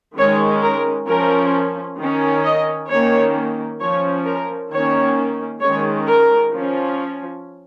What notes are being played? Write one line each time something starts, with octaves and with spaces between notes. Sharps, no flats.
D#3 G#3 C#4 C#5
A#4
F3 C#4 A#4
D#3 C#4
D#5
D#3 A#3 C#4 C#5
F3 C#4 C#5
A#4
D#3 A#3 C#4 C#5
D#3 G#3 C#4 C#5
A#4
F3 C#4